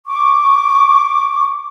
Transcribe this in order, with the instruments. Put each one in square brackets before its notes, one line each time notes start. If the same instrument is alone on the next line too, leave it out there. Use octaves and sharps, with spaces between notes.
[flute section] C#6 D6